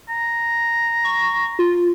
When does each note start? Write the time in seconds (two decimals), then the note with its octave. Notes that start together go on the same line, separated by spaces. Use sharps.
0.09 A#5
1.04 C#6
1.59 F4